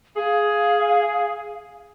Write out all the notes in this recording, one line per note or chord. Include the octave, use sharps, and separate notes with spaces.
G#4 F5